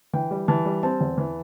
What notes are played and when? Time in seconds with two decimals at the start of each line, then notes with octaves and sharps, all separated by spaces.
0.13 E3 G5
0.31 G3
0.48 E3 A5
0.65 G3
0.83 C4 A5
1.01 E2
1.18 E3